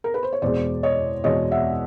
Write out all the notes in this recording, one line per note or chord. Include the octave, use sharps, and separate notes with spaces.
A#4
B4
C5
C#5
E2 B2 G#3 C5 D5
C#5 D#5
E2 B2 G#3 C#5 D#5
E5 F#5